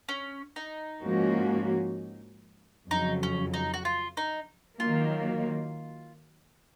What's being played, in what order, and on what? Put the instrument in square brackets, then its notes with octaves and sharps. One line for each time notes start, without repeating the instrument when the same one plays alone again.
[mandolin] C#4
D#4
[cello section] G#2 F3 A#3 C#4 F#4
[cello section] F2 C#3 F#3 [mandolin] D#4
[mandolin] C#4
D#4
F#4
F4
D#4
[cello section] D#3 F#3 A#3 [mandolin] F4